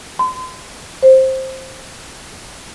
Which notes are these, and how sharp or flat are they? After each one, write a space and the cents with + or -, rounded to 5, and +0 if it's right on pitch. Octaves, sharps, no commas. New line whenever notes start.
C6 -40
C5 +10